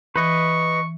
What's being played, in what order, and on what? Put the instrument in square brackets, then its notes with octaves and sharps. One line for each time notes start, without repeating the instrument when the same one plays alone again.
[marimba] E3 [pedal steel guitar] B4 D#5 [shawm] C#6